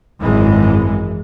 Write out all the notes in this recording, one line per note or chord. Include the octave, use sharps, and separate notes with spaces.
G#1 F#2 E3 G#3